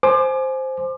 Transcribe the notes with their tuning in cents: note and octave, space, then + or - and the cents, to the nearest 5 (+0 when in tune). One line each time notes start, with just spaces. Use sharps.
C5 +0 G#5 +25 D6 +30